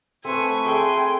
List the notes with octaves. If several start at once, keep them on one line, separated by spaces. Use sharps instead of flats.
A3 C4 B4 E5 G#5 C#6
G#4 A4 E5 G5 G#5 C6